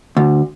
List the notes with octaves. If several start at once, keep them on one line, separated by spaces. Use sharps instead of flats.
D2